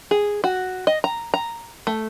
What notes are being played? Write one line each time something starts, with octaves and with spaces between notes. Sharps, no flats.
G#4
F#4
D#5
A#5
A#5
A3